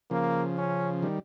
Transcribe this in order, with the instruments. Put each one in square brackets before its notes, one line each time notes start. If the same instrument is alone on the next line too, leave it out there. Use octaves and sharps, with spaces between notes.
[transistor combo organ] C#3 F3 [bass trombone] A#3
[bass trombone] C#4
[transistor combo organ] D#3 G3